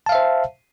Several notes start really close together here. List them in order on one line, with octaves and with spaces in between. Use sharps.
A5 F5 E5 C5